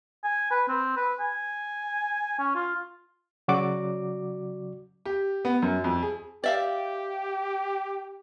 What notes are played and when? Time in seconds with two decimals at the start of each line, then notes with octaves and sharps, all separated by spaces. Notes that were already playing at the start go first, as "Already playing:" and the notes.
0.24 G#5
0.51 B4
0.68 C4
0.96 B4
1.20 G#5
2.39 C#4
2.55 F4
3.48 C#3 F#3 F#4 D5 D6
5.06 G4
5.45 B3
5.62 F#2
5.84 F2
6.03 G#4
6.44 G4 D5 E5 F5